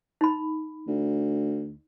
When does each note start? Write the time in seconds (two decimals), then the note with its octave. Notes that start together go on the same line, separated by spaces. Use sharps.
0.21 D#4 B5
0.88 D2